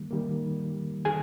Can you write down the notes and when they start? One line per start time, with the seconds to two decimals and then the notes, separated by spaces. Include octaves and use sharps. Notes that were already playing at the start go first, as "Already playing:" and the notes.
Already playing: D#3 G3 A#3
0.11 D#3 G3 A#3
1.05 D#3 G3 G#4 G#5